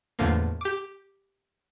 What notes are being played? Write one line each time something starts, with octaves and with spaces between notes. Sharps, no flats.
E2 A2 D3 F3 A#3
G4 D6